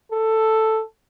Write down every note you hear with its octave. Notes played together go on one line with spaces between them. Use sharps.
A4